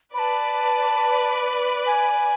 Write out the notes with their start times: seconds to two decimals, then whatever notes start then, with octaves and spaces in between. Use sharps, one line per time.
0.14 B4 D5 A5 B5
1.86 G#5